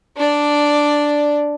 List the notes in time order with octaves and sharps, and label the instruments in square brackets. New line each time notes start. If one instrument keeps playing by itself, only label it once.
[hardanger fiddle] D4 D5